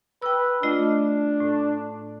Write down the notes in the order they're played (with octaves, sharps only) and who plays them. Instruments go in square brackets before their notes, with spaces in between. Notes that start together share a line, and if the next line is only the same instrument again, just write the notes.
[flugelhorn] B4 [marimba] G5 E6
[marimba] A3 F4 D#5 [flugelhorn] D4
[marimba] A2